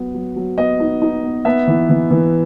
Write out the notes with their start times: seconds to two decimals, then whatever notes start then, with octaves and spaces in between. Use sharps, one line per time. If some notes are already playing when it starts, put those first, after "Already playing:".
Already playing: F#3 B3
0.14 F#3
0.36 F#3
0.57 B3 D#5
0.80 D#4
1.02 D#4
1.24 B3
1.45 B3 E5
1.67 E3
1.89 E3
2.11 E3